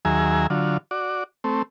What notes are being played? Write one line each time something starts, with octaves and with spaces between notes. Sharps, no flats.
D#2 F#3 G#4 E5 G#5 A#5
D3 F#3 F4
F#4 D5
A3 C4